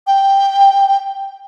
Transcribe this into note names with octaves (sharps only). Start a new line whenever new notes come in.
G5